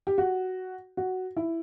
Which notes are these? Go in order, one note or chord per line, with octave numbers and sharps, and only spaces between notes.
G4
F#4
F#4
E4